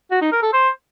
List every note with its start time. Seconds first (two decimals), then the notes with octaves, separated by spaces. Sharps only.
0.11 F#4
0.22 D#4
0.32 A#4
0.43 A4
0.53 C5